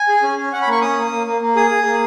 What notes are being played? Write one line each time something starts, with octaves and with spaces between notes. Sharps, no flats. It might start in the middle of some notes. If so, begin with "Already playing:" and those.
Already playing: G#5
G#4
C#4
C#4
C#4 F#5
B5
A#3 C#6
C#4 D#6
A#3
A#3
A#3
A#3
G#4 D#6
G#4
A#3